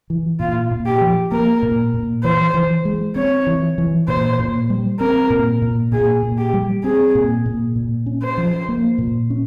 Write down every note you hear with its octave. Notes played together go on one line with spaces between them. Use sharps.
E3
A#2 F4
A#2
G4
F3
A#3 A#4
A#2
A#2
E3 C5
E3
G#3
C4 C#5
E3
E3
A#2 C5
A#2
G3
C4 A#4
A#2
A#2
A#2 G#4
A#2
G4
G3
C4 G#4
A#2
A#2
A#2
C#4
C5
F3
A#3
A#2
C#4